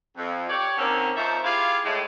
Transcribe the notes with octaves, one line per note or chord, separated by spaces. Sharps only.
F2
G4 C#5 D5
D3 D#3 A#3 C4 C#4
F2 F3 D#4 C5 C#5 E5
E4 F4 G4 G#4 F5
A2 G#3